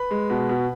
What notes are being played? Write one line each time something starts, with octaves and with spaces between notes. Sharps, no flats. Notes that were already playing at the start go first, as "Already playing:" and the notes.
Already playing: B4 B5
G#3
B2
B2